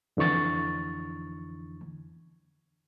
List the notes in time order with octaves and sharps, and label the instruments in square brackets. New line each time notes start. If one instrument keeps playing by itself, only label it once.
[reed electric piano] F2 D3 E3 C#6 A6